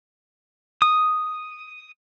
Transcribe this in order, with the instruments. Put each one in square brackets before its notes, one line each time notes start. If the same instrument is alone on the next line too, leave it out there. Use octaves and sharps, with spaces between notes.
[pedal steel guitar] D#6